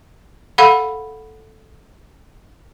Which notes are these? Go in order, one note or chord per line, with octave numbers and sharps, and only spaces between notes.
A4 F5 F#5 B5